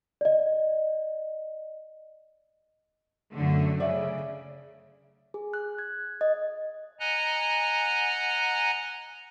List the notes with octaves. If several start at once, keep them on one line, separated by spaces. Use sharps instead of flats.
D5 D#5
F#2 D3 A3
C#3 D5 E5
G#4
F#6
G#6
D#5
D#5 F#5 G#5 A#5 F#6